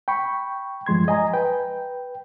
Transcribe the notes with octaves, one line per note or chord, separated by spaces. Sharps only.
G5 B5 C#6
G2 F3 G#3 C6 G#6
D#5 G#5 A#5
B4 G5